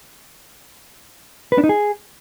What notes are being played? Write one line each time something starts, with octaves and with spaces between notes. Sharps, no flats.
B4
D4
D#4
G#4